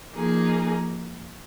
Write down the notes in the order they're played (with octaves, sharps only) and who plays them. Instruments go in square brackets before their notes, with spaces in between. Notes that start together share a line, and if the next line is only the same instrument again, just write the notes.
[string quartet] F3 A#3 D#4 G#4